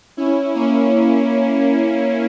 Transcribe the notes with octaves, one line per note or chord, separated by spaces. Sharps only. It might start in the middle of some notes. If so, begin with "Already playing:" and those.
C#4 E4
A#3 C#4